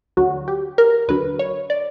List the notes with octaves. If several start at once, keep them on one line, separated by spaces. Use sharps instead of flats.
D2 D3 F#3 F#4
G4
A#4
D2 D3 F#3 B4
C#5
D5